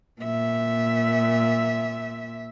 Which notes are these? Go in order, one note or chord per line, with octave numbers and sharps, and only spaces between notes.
A#2 E5